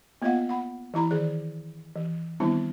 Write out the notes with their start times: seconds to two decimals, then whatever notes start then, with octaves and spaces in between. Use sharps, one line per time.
0.22 A#3 B3 F4 D#5 F5 F#5
0.49 F#5 B5
0.94 E3 E4 A#5 B5
1.11 D#3 G#4 D5
1.96 E3
2.40 D#3 G3 B3 C4 D4 E4